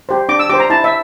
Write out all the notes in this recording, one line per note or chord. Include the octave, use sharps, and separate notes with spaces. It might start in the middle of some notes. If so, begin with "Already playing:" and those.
G4 C5
D4 D6
E6
G4 C5 D6
A#5
E4 A5
E5